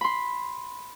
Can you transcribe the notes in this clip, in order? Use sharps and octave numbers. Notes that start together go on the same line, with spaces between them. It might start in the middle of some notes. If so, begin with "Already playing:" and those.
B5 C6